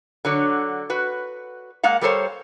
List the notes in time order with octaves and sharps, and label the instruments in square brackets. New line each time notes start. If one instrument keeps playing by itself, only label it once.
[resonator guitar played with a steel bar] D3 F#3 C#5
F#4 B4
G#3 A#3 F5 F#5
G3 A4 A#4 C5 C#5